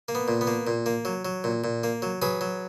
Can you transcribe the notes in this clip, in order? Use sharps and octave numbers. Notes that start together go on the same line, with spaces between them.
A#3
B3
A#2
B3
A#3
A#2
A#3
F#3
F#3
A#2
A#2
A#3
F#3
F#3 G#4 B4
F#3